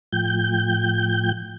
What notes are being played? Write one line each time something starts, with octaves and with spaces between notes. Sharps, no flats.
A2 F3 G5 G6